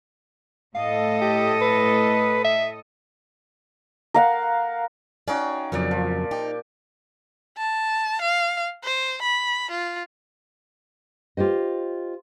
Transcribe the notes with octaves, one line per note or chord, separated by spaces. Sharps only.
A2 A4 D#5 F5
G4
B4
E5
A#4 F5 F#5
C#4 D#4 F#4 D5 F5 G5
F2 A#2 C#3 F#3 D5
F3
D#4 G4
A5
F5
C5
B5
F4
F4 G4 C5 D#5